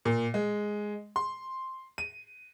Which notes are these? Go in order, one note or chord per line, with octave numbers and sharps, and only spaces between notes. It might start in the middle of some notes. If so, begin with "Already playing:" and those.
A#2
G#3
C6
D#7